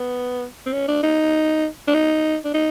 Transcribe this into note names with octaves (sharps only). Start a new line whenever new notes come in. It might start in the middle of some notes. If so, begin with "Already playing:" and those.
Already playing: B3
C4
C#4
D4
D#4
D4
D#4
D4
D#4